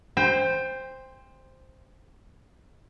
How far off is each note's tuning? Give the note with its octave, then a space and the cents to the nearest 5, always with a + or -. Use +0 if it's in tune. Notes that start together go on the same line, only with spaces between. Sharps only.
C5 +0 G5 +30